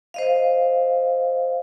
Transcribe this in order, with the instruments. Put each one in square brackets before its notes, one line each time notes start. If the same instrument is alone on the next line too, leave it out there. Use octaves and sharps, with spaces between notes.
[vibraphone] C5 D#5 F5